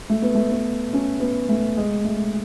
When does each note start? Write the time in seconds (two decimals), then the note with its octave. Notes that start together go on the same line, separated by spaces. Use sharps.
0.10 A3
0.22 B3
0.35 A3
0.52 B3
0.93 C#4
1.20 B3
1.49 A3
1.77 G#3
2.05 A3